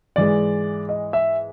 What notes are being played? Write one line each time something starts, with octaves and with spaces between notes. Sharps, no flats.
G#2 E3 G#3 D5
D#5
E5